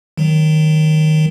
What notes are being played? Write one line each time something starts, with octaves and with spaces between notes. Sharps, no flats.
D#3 F#3